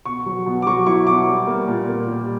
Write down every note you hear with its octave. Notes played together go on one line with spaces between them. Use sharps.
B2 C#6
F#3
B2
D6
F#3 C#6
E4 C#6
B2 D6
G3
A#3
A#2
A#3
G3